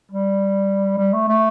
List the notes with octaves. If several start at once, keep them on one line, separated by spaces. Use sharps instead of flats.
G3
G3
A3
A3